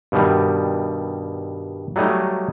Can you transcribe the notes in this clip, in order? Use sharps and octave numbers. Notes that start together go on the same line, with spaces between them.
G2 B2 D#3 G3
F#3 G3 A3 D#4 D#5